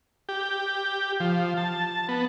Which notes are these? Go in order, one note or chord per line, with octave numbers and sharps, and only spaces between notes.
G4
F3
A5
B3